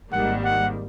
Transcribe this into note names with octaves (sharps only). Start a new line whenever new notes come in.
G#1 G#2 D#3 G3 A#3 F#5
F#5